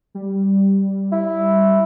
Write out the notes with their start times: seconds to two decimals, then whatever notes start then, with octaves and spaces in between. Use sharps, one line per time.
0.15 G3
1.12 E4